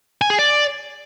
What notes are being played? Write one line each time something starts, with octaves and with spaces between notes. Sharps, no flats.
G#5
G#4
D5